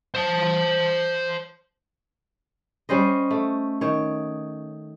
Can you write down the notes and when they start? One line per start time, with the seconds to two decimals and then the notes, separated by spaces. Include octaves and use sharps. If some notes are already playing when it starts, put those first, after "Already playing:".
0.14 C5 A5
2.89 G3 C#4 C5 D#5
3.31 A3
3.81 D#3 C#5